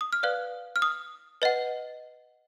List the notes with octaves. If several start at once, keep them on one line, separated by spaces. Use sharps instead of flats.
D#6
F6
B4 D5 F5 F#6
F6
D#6
B4 D#5 F#5